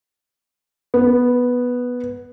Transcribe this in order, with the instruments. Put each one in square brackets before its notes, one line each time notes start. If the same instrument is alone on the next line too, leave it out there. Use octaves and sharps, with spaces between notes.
[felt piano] B3